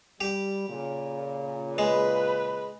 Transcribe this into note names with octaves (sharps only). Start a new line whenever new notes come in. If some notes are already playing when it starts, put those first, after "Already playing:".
G3 G4
A#2 C#3
G#3 B4 B5